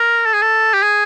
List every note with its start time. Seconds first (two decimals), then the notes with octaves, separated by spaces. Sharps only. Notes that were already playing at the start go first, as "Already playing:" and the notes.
Already playing: A#4
0.26 A4
0.33 G#4
0.42 A4
0.73 G4
0.82 G#4